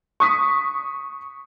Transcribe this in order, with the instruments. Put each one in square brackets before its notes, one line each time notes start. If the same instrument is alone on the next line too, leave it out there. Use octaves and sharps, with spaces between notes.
[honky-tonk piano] C#6 D#6 B6